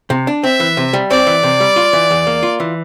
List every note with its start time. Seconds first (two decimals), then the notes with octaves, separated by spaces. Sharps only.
0.10 C3
0.27 D4
0.43 C4 E5
0.60 E3
0.77 C3
0.93 G3
1.10 C4 D5
1.27 E3
1.43 C3
1.60 G3
1.76 F4
1.93 E3
2.11 E2
2.27 A#3
2.43 F4
2.60 E3